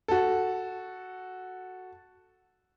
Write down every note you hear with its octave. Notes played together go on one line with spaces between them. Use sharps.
F#4 A4